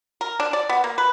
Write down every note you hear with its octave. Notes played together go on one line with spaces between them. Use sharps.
A#4
D4
D5
B3
A#3
B4